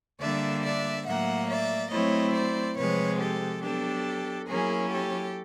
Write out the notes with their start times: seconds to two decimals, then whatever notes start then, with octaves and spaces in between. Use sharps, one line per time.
0.21 D3 G3 A#3 D4 D5 E5
0.64 D5 E5
1.06 A2 F#3 A#3 E5 F#5
1.50 D5 E5
1.91 F#3 A3 C4 E4 C#5 D#5
2.34 C5 D5
2.77 C3 F3 G#3 B4 C#5
3.20 G4 A4
3.62 F#3 B3 D4 G4 A4
4.48 F#3 A#3 C#4 E4 G#4 A#4
4.90 G4 A4